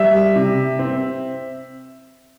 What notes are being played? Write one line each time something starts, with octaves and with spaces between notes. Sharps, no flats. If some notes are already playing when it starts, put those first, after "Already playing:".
Already playing: G3 E5
C3
C4